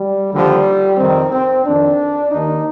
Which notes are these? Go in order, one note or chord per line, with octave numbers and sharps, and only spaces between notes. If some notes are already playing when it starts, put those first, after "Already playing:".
Already playing: G3
D#2 D3 F3 G3
F2 C3 D#3 C4
C4
F2 D#3 D4
D#2 D#3 D#4